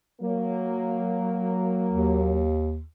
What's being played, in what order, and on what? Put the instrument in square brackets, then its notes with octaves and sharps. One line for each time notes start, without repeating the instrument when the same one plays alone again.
[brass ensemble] F#3 A#3
[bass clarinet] D#2